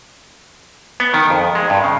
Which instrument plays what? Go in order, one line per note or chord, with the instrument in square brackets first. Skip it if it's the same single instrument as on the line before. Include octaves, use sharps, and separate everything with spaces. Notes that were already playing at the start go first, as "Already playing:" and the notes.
[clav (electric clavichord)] B3
D#3
F2
G#3
G2
C#3